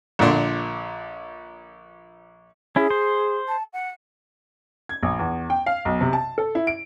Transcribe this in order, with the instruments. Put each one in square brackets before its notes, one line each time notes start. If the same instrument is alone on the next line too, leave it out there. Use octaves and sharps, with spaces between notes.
[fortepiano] A#1 A#2 D3 D4 A#5 C6
[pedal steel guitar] C#4 E4 [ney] G#4
[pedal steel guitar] C5
[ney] A5
F#5
[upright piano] G#6
A#1
E2
G5
F5
B1
C3
A5
A4
E4
D7